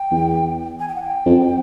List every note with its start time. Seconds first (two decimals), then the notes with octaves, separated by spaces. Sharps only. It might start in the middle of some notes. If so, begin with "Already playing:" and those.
Already playing: G5
0.11 E2
0.80 G#5
0.88 G5
0.95 F#5
1.03 G5
1.26 F2